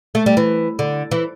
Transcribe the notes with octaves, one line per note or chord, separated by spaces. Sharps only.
A3
G3
E3
D3
E3